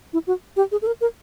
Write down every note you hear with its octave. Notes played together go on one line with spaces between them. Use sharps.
E4
F#4
G4
G#4
A4
A#4
A#4